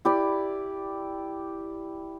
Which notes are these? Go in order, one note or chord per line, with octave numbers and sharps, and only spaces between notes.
E4 G4 D5